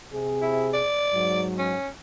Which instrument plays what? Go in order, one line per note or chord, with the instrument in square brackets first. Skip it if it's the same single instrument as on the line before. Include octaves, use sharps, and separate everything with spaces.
[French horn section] C3 G#4
[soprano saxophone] E4
D5
[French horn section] G#2 F#3
[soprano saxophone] C#4